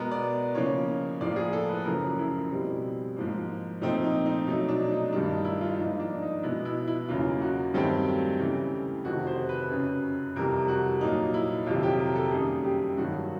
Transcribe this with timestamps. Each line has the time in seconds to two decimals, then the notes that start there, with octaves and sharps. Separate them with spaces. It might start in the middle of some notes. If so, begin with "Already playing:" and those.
Already playing: B2 G#3 B3 A#4
0.11 D5
0.55 C#3 F3 A#3 C#5
1.21 A2 F3 A#3 D5
1.36 G#4
1.53 A4
1.69 B4
1.85 F#2 C#3 F3 A3 A#4
2.19 E4
2.51 B2 G3 C4
3.16 G#2 F3 A#3
3.81 A#2 F3 A3 C4 D#4
4.04 D#4
4.26 D#4
4.47 B2 F#3 A3 D#4
4.68 D4
4.91 D#4
5.12 G2 D#3 G3 D4
5.29 D#4
5.45 E4
5.61 F4
5.78 G#2 F3 A#3 D#4
6.00 D4
6.22 D#4
6.43 B2 G#3 B3 E4
6.65 E4
6.88 E4
7.09 E2 C#3 F#3 A#3 F4
7.41 F#4
7.74 G2 D#3 F#3 A3 C4 G4
8.40 C#3 E3 A3
9.05 F2 C3 D#3 F#4
9.27 C5
9.49 B4
9.70 F#2 C#3 F#3
10.36 F2 C3 E3 G3 A#4
10.68 F#4
11.01 A#2 F#3 A#3 D#4
11.34 E4
11.66 F2 C3 D#3 F#3 F4
11.83 G4
12.00 A#4
12.16 A4
12.31 F#2 D#3 G3 A#3 G#4
12.65 G4
12.97 G2 D#3 F#3 F#4